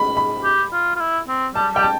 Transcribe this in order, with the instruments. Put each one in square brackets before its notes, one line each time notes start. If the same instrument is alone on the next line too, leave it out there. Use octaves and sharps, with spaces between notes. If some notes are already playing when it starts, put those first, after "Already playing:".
Already playing: [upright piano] B5
B5
[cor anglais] G4
F4
F4
E4
C4
[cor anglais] G3 [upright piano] A5
[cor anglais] G3 [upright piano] G5
[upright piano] A5